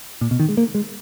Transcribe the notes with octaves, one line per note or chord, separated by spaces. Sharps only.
A#2
B2
D#3
G#3
A#3
G#3